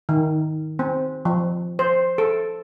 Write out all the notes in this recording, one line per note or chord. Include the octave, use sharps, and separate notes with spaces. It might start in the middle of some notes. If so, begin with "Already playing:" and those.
D#3
C4
F3
C5
A4